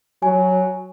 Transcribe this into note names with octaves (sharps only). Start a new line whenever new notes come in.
F#3 G#5